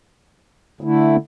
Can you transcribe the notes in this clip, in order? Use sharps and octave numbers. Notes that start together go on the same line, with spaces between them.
D3 A3 E4